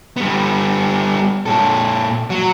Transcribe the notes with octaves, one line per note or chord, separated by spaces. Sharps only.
G3 B3
A#2 A4
F#3